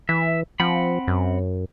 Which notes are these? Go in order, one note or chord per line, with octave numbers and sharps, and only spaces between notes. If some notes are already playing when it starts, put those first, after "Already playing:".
E3 E5
F3 C4 F#5 B5
F#2